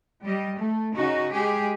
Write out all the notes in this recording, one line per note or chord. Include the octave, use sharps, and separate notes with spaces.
G3 D#5
A3
C#3 D#4 F#4
G#3 G4 G#4